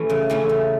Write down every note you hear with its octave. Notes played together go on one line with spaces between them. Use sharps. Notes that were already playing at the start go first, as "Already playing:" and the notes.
Already playing: E3 A3 C#4
C#3
E3 A3 C#4
C#3